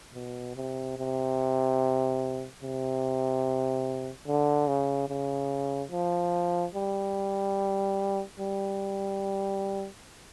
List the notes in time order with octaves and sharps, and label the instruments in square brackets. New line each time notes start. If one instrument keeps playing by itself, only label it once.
[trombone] B2
C3
C3
C3
D3
C#3
C#3
F3
G3
G3